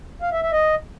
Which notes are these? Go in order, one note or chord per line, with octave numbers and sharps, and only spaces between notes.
F5
E5
E5
D#5